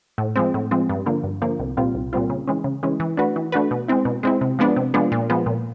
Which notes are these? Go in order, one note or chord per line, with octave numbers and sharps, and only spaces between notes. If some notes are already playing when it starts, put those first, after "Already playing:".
A2
F3 G#3 C4
A2
F3 G#3 C4
G2
D3 F3 A#3
G2
D3 F3 A#3
C2
A#2 G3 C4 F4
C2
A#2 G3 C4 F4
C#3
E3 G#3 C#4
C#3
E3 G#3 C#4
E3
A3 D4 F#4 B4
E3
A3 D4 F#4 B4
B2
G#3 C4 E4
B2
G#3 C4 E4
C3
F3 G#3 B3 D4
C3
F3 G#3 B3 D4
A#2
F3 G#3 B3
A#2